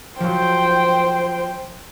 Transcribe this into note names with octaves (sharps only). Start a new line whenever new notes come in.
F3 F#3 C5 G5